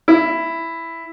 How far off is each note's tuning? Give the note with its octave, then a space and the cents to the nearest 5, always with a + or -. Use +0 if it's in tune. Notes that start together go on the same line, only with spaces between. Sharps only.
E4 +5